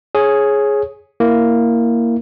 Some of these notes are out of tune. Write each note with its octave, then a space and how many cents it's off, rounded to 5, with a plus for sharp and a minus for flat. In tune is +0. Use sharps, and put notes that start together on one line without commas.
G#4 +5 C#5 -15
A#3 +0 E4 +0